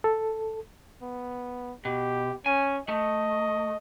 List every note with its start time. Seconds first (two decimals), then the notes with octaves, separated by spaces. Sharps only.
0.04 A4
1.02 B3
1.85 B2 G4
2.46 C#4 G#5
2.89 A3 D#5